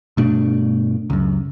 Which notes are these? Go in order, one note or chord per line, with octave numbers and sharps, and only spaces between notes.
G2 B2 A3 D4
C#2 F#2